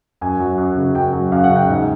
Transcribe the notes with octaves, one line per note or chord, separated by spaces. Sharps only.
F#2 G#5
F#3
F#2
C#3
F#2 G5
F#3
F#2 F5
F#5
C#3
G5
G#2